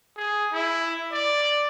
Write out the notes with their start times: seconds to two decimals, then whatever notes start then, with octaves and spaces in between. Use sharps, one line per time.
0.17 G#4
0.52 E4
1.12 D5